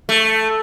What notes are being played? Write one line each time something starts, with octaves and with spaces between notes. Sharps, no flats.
A3